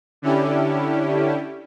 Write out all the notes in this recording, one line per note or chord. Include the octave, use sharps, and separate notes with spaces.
D3 C#4 D4 E4 G4